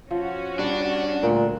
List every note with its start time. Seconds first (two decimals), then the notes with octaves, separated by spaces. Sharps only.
0.11 F3 C#4 F#4
0.59 G3 D4 D5
1.23 D2 A#2 G5